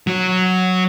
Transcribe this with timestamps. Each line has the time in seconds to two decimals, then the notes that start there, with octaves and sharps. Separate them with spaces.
0.07 F#3 F#4